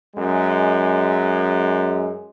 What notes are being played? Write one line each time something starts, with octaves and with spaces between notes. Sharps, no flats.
F#2 G#3